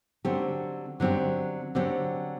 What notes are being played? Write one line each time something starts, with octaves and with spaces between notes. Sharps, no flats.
D3 F#3 C4 G4
D3 F#3 C4 G4
D3 F#3 C4 G4